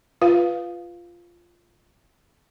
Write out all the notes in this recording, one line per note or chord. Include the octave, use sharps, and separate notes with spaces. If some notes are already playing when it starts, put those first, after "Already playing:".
F4 B4 F5